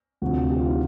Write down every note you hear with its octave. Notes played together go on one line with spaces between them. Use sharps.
D2 C3 F3 F#4
G4
F4
D#4